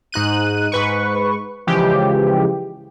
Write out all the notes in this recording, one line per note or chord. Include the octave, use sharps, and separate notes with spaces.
G#2 D#4 F#6 D#7
G#2 B4 C#6
C#3 E3 F3 G#3 G4